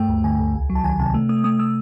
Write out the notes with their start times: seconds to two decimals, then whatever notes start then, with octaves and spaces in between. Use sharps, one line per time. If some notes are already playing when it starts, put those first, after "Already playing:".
Already playing: G2 A3 G5
0.09 D2
0.24 D3 G#5
0.39 D2
0.54 C2
0.70 F#3
0.75 A5
0.84 D#3 G#5
0.99 C3 A5
1.14 A3
1.29 A3 D#6
1.44 A3 D#6
1.59 A3 E6